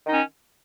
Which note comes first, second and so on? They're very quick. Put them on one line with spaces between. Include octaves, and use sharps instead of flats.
D#3 D#4 C#4